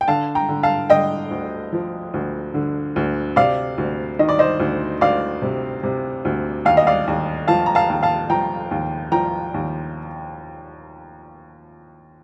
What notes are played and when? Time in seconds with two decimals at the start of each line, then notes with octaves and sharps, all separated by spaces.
0.01 G5
0.08 D3 F5 A5
0.35 G5 A#5
0.49 D3
0.63 F5 A5
0.90 D3 D#5 G5
1.31 D2
1.73 F3
2.14 D2
2.54 D3
2.96 D2
3.36 C3 D5 F5
3.78 D2
4.19 D#3 D#5
4.29 D5
4.39 C5 D#5
4.60 D2
5.01 D2 D5 F5
5.42 C3
5.83 C3
6.25 D2
6.65 D#2 F5
6.77 D#5
6.87 D5 F5
7.07 D#2
7.47 F3 F5 A5
7.66 A#5
7.75 F5 A5
7.90 D#2
8.03 F5 A5
8.30 F3 G5 A#5
8.71 D#2
9.12 F3 G5 A#5
9.54 D#2